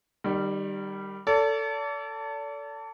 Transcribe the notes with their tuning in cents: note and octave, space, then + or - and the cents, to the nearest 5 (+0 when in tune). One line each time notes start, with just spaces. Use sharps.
D#3 -30 G3 +0
A4 +20 D5 -40